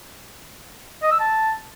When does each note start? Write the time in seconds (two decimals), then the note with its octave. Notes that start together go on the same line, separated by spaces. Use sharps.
1.03 D#5
1.11 E6
1.20 A5